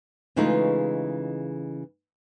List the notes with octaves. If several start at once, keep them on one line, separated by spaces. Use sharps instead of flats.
C#3 E3 G#3 A3 D#4 F4